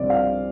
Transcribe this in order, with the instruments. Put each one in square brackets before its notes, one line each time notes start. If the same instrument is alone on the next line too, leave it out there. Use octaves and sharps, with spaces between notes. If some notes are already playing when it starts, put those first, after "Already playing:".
Already playing: [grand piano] C2 C3 F3 C4 [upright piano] D5
[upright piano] F5